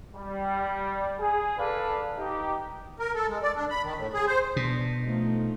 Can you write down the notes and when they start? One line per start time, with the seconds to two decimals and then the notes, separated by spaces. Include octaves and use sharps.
0.15 G3
1.19 G#4
1.57 D4 A4 B4 D5 F5
2.17 D#4 G4
2.99 A#4
3.15 A4
3.28 G#3
3.42 D5
3.56 D4
3.70 B5
3.83 D#3
3.97 A2
4.14 G#4
4.27 C5
4.56 B2 D4
5.02 F3 A3 D#4